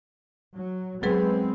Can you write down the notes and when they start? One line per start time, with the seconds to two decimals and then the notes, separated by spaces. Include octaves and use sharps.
0.55 F#3
1.03 F#3 G#3 B3 C4 G#4 B4